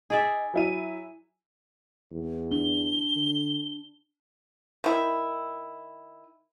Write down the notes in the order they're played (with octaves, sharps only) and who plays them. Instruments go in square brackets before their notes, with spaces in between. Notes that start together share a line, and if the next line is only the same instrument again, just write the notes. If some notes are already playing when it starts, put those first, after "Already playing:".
[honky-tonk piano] D#4 [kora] G#4 D5 E5
[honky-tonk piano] F#3 E4 D#7
[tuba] E2
[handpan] D4 [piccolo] G7
[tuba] D3
[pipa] D#3 E4